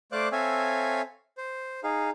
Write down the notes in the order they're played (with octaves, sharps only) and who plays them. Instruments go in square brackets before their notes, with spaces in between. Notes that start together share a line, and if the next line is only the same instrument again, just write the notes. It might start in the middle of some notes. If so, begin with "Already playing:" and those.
[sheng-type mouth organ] A3 C5 D5 F5 D6 F#6
C4 A4 C#5 E5 F5 G#5
C5
D#4 G#4 F5